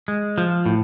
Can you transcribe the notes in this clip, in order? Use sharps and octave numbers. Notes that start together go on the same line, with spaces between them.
G#3
F3
A2